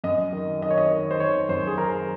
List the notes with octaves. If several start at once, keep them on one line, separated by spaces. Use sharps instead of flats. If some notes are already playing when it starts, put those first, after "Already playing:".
F#2 D#5
D#3
D#3 D#5
C#5
D#5
D#3
C5
D#3 C#5
F#2 C5
G#4
D#3 A#4